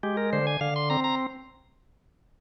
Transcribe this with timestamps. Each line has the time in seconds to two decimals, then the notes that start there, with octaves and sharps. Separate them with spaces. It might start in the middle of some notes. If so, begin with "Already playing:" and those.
0.03 G#3 G4
0.17 A#4
0.33 D3 C5
0.47 G#5
0.61 D3 F5
0.76 C6
0.90 C4 A#5
1.04 A#5